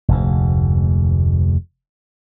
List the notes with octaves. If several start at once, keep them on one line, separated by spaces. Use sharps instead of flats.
F1 D2 G#2